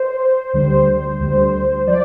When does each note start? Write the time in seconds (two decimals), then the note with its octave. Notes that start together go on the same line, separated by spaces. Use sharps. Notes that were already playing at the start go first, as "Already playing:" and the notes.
Already playing: C5
0.53 D2 D3 G3 C5
1.20 D2 D3 G3
1.87 F3 D5